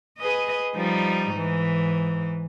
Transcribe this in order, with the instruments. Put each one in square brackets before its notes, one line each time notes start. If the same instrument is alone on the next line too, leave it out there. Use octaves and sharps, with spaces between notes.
[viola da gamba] G#4 B4 D#5
F3 G3 D#4
G#2 E3